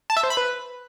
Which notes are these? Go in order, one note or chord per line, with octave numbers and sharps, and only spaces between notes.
A5
E5
C5
B5
B4